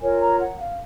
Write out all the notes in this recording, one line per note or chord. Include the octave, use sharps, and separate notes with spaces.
F4 A#4 C#5 G#5
A#5
F#5
F5